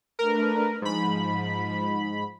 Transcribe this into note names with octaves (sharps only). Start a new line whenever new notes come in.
A3 D4 A#4 B4
G#2 F3 B5